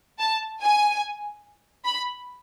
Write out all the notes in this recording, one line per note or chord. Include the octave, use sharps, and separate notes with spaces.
A5
G#5
B5